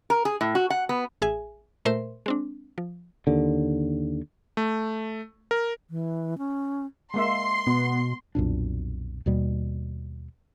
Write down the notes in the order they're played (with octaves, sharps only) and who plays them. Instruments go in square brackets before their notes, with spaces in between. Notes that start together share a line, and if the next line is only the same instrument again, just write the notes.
[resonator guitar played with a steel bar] A#4
G#4
A2
F#4
F#5
B3
[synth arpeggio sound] A1 G#4 E5 G#5
A#2 A3 A#4 C5 E5 C6
G#3 C4 D4
F3
[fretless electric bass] D#2 D3
[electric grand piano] A3
A#4
[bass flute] E3
C#4
[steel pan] G#3 A#3 E5 [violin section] C6
[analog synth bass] B2 [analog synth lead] B3
[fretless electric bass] B1 F2 A#2 D4
D#2 B2 G3